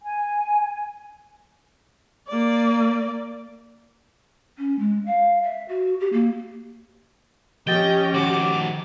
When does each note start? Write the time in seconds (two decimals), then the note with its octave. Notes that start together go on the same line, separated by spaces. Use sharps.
0.03 G#5
2.28 A#3 D5
4.58 C#4
4.79 G#3
5.06 F5
5.43 E5
5.69 F#4
6.00 G4
6.13 A#3
7.67 F3 C#4 G4 D#5 G5 A6
8.14 D#3 F#4 D6